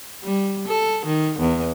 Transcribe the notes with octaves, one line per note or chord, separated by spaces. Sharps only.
G3
A4
D#3
E2